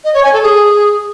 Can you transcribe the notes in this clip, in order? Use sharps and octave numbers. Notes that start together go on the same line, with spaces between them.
D#5
C#5
G#5
A4
G#4